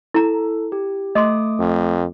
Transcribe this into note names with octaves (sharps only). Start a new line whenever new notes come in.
E4 A4 A#5
G4
A3 D#5 C6 D6 D#6
F2